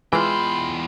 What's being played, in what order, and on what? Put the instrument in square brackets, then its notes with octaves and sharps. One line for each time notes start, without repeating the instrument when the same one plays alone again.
[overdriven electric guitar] E2 G5 [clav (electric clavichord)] E3 [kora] G#3 E4 F4 [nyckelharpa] B5 C6